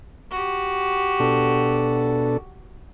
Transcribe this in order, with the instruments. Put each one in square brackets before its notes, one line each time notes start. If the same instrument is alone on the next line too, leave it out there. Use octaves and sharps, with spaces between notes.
[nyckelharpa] F#4 G4
[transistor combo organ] B2 D4 A4